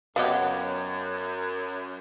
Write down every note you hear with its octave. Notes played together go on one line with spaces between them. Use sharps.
F#2 B3 F#4 G4 C#5 D#5 F5